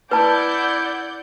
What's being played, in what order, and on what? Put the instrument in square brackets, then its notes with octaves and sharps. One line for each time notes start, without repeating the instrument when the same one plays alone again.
[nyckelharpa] E4 [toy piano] B4 A5 [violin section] D5 F#5 G6